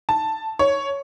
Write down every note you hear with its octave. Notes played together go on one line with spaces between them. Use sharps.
A5
C#5